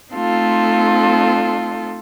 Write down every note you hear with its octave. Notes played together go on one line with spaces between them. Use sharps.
A3 C4 D#4 F4 A4